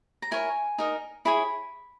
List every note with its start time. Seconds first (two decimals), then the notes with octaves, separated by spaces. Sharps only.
0.22 A#5
0.31 E4 A#4 C#5 G#5
0.78 D#4 A#4 D#5
1.25 E4 G#4 C#5 B5